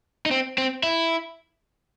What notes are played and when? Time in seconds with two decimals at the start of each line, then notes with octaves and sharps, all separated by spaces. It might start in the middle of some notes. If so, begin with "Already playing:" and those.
0.26 D#4
0.31 C4
0.58 C4
0.83 E4